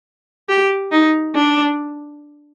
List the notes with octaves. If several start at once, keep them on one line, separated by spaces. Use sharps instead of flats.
G4
D#4
D4